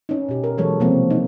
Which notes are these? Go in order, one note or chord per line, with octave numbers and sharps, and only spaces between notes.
C#4 D#4
B2 G4
A#4
E3 F#3 G#3 A4 C#5
C3 F3 A#3 C4
C4 D#4